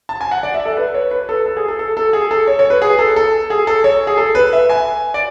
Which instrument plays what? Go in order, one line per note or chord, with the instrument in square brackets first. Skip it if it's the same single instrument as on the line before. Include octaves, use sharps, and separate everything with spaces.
[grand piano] A5
G#5
F#5
D5
E5
A4
B4
C#5
B4
A4
A4
G#4
A4
A4
A4
G#4
A4
C#5
C#5
B4
G#4
A4
A4
G#4
A4
C#5
G#4
A4
B4
E5
G#5
D5